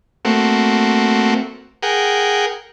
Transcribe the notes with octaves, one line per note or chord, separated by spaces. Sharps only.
A3 A#3 C4 F#4
G#4 A#4 F#5 G5